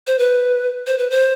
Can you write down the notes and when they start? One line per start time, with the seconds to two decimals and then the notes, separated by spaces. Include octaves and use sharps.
0.07 C5
0.19 B4
0.87 C5
0.98 B4
1.10 C5